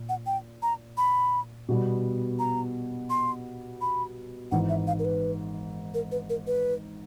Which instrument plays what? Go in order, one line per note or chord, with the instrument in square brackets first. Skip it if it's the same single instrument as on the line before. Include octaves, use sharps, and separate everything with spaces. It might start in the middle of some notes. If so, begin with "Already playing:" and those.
Already playing: [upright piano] A#2
[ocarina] F#5
G5
A#5
B5
[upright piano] B2 G3 B3
[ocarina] A#5
C6
B5
[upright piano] G#1 G#2 E3 [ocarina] F#5
[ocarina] E5
F5
A#4
B4
A#4
B4
A#4
B4